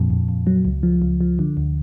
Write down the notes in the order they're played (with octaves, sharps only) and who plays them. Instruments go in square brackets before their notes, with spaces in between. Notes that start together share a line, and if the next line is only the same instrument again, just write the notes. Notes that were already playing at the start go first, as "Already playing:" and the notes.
Already playing: [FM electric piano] F2 A#2
F2
F2
F#3
C#2
F3
C#2
F3
D3
D2